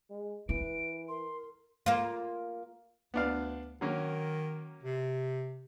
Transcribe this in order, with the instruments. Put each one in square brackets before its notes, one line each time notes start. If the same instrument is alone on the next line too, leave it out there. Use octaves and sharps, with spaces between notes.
[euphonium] G#3
[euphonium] E3 [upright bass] E4 [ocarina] B4 [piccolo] D7
[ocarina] A#4 [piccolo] C6
[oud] A#3 F4
[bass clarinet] D2 [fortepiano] B3 D4 F5
[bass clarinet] D#3 [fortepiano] F#3 A#3 C#4
[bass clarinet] C3